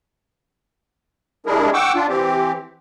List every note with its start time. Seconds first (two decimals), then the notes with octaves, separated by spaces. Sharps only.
1.46 G3 G#3 D4 E4 G#4 A#4
1.74 F#5 G5 C#6 D6 E6
1.95 D4 F4
2.09 E3 C4 G4